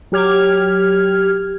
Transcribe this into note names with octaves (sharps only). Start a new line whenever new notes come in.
F#3 G4 F6 G#6